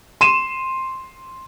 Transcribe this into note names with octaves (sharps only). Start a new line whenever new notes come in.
C6 D#7 E7